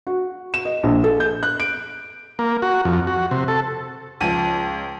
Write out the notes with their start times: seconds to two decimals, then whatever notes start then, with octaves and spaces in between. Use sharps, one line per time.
0.07 F#4
0.54 E7
0.65 D#5
0.83 A#1
1.04 A4
1.20 G6
1.43 F#6
1.60 D7
2.39 A#3
2.62 F#4
2.85 F2
3.07 F#4
3.31 C3
3.48 A4
4.21 C#2 F3 D#7